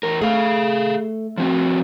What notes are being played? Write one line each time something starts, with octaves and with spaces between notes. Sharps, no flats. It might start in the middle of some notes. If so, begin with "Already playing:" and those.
E2 A#4
A3 G#4 F5
F3 C4 F#4